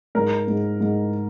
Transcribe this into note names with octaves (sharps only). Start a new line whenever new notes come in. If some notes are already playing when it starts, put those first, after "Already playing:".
G#2 A#4
G#2
G#2